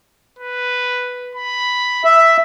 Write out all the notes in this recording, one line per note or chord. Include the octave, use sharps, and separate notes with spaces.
B4
B5
E5